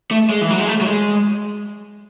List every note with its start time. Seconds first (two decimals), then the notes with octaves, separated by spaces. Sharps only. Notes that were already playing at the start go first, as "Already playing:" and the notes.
0.11 A3
0.30 G#3
0.41 E3
0.50 F#3
0.59 G#3
0.68 A3
0.81 F#3
0.86 G#3